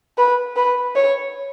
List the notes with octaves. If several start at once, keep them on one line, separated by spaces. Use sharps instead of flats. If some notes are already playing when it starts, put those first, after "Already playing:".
B4
B4
C#5